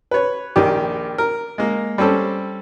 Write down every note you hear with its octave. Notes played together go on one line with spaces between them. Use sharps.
B4 C#5
A#1 D#3 G4
A#4
G#3 A#3
G3 C4 C#4 A4